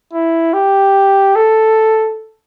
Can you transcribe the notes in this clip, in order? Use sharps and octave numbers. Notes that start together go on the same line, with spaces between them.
E4
G4
A4